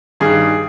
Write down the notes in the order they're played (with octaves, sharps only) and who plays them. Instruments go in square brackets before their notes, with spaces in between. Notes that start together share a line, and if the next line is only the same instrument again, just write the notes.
[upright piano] G2 D#3 G3 G#4